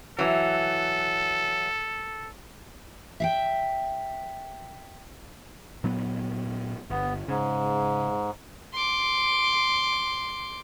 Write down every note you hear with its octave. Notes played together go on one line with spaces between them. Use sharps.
E3 F#3 A4
E5 F5 G5
A#2 F#3 B3
G1 B3
G#2 C#3
C6 D6